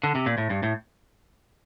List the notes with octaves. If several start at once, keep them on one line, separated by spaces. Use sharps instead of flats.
D3
C3
A#2
A2
G2
A2